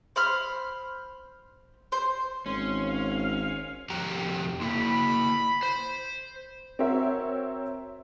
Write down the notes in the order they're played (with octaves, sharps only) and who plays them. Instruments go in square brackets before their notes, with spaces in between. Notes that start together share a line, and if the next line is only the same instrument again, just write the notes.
[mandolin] C5 B5 F6
C5
[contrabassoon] G#1 [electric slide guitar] C#4 [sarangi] C6
[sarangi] F5
[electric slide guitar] F2 G4 A#5
[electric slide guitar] A#3 E4 [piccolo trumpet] B5
[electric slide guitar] C5
[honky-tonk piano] C4 F#4 A#4 C#5 E5